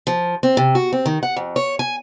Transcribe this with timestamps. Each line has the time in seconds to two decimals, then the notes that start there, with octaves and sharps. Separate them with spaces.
0.07 F3
0.43 C4
0.57 C3
0.75 F#4
0.92 C4
1.06 D#3
1.23 F#5
1.36 F2
1.56 C#5
1.79 G#5